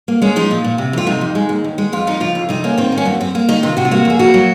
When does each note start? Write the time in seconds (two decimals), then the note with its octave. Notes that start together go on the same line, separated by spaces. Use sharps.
0.08 A#3
0.22 G#3 C#4
0.36 F3 D#4
0.51 A#2
0.64 A#2
0.78 C3
0.93 F2 F4
1.07 C3 D#4
1.21 F2
1.35 G#3
1.49 D#2
1.64 D#2
1.78 G#3
1.92 F2 F4
2.07 F3 D#4
2.20 C#3 F4
2.35 F2
2.49 C3 D#4
2.64 A#3 C#4
2.78 D#3 C4
2.92 A#3
2.98 C#4
3.05 F#2 C4
3.20 F#2 C4
3.35 A#3
3.49 D#3 D#4
3.63 C3 F4
3.77 C3 F#4
3.85 F4
3.91 A#3 F#4
4.05 F2 G#4
4.19 A#3 F#4
4.34 F#3